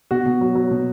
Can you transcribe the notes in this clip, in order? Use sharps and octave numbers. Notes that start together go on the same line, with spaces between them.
B2 F#4
B2
F#3
F#3
B2